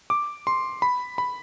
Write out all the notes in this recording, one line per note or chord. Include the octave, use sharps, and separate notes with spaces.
D6
C6
B5
B5